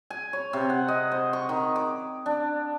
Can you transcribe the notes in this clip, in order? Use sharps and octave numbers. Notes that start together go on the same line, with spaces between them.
G#5
C#5
C3
F#5
D#5
C5
C#6
D#3
D6
D4